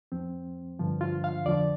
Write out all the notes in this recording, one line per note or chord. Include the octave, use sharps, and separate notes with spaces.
F2 F3 C4
G2 D3 F3
F4
F5
F2 D3 F3 D5